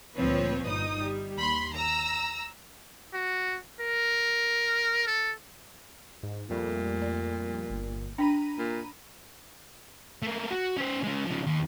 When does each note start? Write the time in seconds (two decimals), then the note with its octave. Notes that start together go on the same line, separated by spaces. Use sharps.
0.15 D2 A#2 F3 C4 B4 C#5
0.66 G1 D#4 D#6
0.99 G3
1.37 D#2 B5 C6
1.74 A#5 E6
3.13 F#4
3.80 A#4
5.07 A4
6.23 G#2
6.50 F2 A#2 G3 A3
7.02 D5
7.70 G1
8.18 D4 G5 A#5 B5 D#7
8.58 A#2
10.23 A3 A#3
10.51 F#4
10.77 C#4 C5
11.04 G#3 C#4
11.27 C#3 F3
11.47 D#2